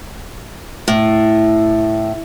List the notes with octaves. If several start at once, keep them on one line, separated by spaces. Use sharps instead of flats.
A2